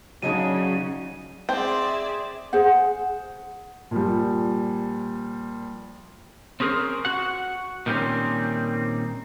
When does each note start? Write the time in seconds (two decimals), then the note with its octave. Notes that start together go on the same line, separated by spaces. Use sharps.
0.22 C#3 F#3 D4 D#4 G#4 D#7
1.49 C4 G#4 D5 E5
2.53 G#4 C5 F#5
3.91 A#2 F3 G3
6.60 C4 C#4 G#4 A#4 C5
7.05 F#4 F#5
7.86 A#2 D#3 G3 A3 C4 C#4